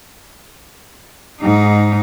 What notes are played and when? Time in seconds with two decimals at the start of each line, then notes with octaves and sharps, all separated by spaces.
1.41 G#2 D#4